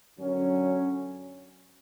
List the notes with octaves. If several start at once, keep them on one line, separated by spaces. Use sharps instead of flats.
F#2 D3 F#3 C#4